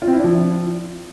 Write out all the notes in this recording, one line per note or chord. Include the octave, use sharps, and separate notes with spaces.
F4
C4
E4
D4
F3